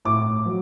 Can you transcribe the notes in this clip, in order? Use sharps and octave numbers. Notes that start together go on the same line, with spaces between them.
A2 D6
F#3